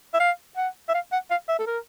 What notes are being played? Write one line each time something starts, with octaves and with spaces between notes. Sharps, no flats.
E5
F5
F#5
E5
F5
F#5
F5
E5
A4
A#4